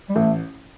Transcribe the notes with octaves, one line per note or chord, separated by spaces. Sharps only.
G3
A1 A3